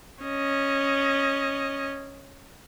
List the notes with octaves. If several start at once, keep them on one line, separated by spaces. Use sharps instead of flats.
C#4 D#5